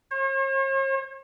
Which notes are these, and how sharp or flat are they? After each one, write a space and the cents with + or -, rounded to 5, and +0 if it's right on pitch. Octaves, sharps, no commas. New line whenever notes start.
C#5 -45